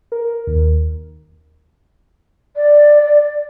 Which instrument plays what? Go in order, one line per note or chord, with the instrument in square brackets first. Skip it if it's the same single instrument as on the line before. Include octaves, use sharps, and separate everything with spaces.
[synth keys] A#4
D#2
[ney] D5